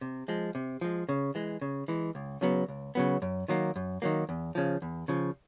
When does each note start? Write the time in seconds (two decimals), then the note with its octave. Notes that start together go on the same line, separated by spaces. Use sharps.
0.01 C3
0.28 F3 G#3
0.55 C3
0.81 F3 G#3
1.09 C#3
1.35 E3 G#3
1.61 C#3
1.88 E3 G#3
2.15 C#2
2.41 C#3 F#3 B3
2.69 C#2
2.95 C#3 F#3 B3
3.22 F#2
3.48 D#3 F#3 A#3
3.76 F#2
4.02 D#3 F#3 A#3
4.29 E2
4.55 C#3 F3
4.82 E2
5.08 C#3 F3